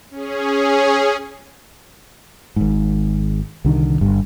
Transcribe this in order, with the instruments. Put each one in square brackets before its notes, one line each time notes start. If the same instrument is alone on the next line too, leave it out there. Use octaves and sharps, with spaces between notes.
[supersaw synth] C#4 G#4
[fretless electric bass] G#1 G#2
C2 D3 D#3
G1 G2